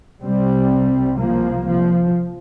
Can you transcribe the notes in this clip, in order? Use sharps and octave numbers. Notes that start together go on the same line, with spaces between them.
C2 C3 G3 C4
F3 A#3
F3